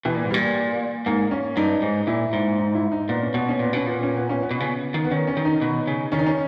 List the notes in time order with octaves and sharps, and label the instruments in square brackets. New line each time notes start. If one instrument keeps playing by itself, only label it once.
[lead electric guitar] B2 [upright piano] E3
[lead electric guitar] A#2
G#2
[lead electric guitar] A#2 [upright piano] G3
[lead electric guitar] G#2 [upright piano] A#3
[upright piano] C#4
[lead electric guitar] G2 [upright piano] D#4
[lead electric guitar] G#2
[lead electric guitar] A#2 [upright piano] E4
[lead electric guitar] G#2
[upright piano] D#4
E4
D#4
[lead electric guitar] A#2 [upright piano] B3
[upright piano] C#4
[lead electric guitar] B2 [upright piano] B3
[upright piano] C#4
[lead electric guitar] A#2 [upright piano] B3
[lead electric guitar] B2 [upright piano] C#4
[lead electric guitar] A#2 [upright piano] B3
[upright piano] C#4
B3
C#4
B3
[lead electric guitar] B2
C#3
D#3
[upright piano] B3
[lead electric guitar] D#3 [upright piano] C#4
[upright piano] C#4
[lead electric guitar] D#3
[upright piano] D#4
[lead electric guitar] B2
C#3
[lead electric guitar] D#3 [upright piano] C#4
[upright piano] D#4
C#4